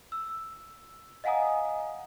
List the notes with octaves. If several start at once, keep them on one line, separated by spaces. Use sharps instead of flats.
E6
D#5 F5 F#5 G#5 A#5 D#6